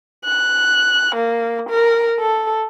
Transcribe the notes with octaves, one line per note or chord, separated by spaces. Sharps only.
F#6
A#3
A#4
A4